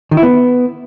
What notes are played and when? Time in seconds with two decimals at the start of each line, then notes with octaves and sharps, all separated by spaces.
0.11 D#3
0.17 E4
0.23 B3